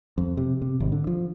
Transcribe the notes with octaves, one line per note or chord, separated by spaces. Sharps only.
F2
C3
C3
G#1
D3
F3